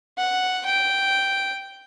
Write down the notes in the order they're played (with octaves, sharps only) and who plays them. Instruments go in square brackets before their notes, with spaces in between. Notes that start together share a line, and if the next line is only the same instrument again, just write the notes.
[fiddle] F#5
G5